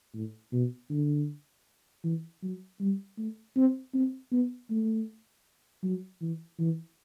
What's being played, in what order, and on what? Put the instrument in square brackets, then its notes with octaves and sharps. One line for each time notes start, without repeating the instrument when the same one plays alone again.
[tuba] A2
B2
D3
E3
F#3
G3
A3
C4
C4
B3
A3
F#3
E3
E3